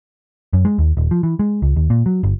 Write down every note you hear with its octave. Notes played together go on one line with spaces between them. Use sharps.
F#2
G#3
D#2
D#1
F3
E3
G#3
C#2
D#2
A#2
F#3
G1